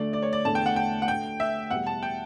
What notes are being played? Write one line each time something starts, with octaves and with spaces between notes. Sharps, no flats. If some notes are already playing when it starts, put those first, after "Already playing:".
Already playing: D2 D3 A3 D4 D5
D5
C#5
D5
E2 D3 A3 A5
G5
F#5
G5
F#5
D2 D3 A3 G5
E5
E2 B2 G3 F#5
A5
G5